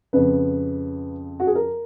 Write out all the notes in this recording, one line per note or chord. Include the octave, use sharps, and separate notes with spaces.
F2 C#3 B4
F#4
G#4
A#4